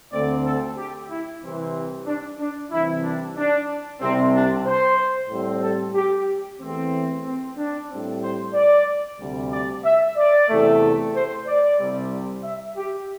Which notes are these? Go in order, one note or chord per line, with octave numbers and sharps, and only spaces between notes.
D2 D3 A3 C4 D5
A4
G4
E4
C2 C3 E3 C4
D4
D4
C2 C3 E3 E4
D4
D4
C2 C3 G3 C4
D4
C5
A2 G3 C4
A4
G4
E2 E3 A3 C4
C4
D4
A2 G3 C4
C5
D5
D2 C3 G3
D5
E5
D5
E2 C3 E3 A3
C5
D5
C2 C3 G3 C4
E5
G4